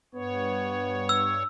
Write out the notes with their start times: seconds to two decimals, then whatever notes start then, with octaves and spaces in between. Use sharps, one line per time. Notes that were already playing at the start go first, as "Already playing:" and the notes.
0.14 G2 B3 C#5
1.09 E6